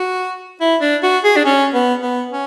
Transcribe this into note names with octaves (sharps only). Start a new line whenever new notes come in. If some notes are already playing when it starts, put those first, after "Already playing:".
Already playing: F#4
E4
D4
F#4
G#4
D4
C#4
B3
B3
C#4